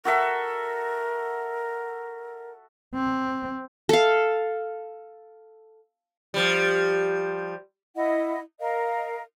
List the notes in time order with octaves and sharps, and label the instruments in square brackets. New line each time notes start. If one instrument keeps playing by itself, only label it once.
[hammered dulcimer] F#4 A4 E5 [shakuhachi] A#4
[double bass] C4
[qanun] A4 F5
[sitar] F3 G3
[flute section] E4 D#5 F#5
A#4 D#5 F5